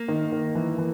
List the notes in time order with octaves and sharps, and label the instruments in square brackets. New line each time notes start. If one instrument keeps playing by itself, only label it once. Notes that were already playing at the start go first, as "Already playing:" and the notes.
Already playing: [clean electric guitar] A#3
[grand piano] D#3
D#3
E3
E3